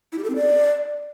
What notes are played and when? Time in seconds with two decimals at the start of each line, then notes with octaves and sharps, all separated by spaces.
0.12 E4
0.18 G4
0.24 A4
0.30 C4
0.36 D5